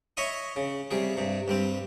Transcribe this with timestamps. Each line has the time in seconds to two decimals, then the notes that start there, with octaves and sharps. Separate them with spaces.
0.17 C#5 D#5 E5 B5 D#6
0.56 C#3
0.91 C3 G3 G#4
1.17 G2 C3
1.48 G2 G3 C4